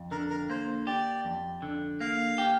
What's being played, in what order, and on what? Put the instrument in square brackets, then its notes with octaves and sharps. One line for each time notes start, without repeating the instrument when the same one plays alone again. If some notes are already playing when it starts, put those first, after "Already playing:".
Already playing: [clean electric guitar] F2
[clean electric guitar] D3 [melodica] A#4
[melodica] A#4
[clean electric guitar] A#3 [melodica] C5
[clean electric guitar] G4 [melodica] D5
[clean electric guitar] F2
D3
[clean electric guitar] A#3 [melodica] F5
[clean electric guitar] G4